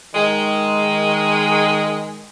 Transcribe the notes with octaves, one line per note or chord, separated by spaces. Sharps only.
D#3 G#3